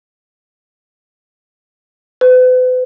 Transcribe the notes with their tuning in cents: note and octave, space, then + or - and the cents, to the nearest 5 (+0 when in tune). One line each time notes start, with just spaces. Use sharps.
B4 +45